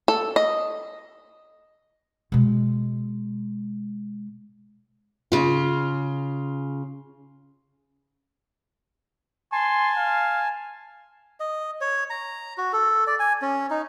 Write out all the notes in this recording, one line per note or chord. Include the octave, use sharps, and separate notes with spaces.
A4
D#5
B2 G#3
C#3 F4
G#5 A5 C6
F5
D#5
C#5
A#5
F#4
A4
D5
G#5
C#4
D#4